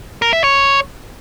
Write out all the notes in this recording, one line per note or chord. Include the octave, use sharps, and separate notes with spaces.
A#4
E5
C#5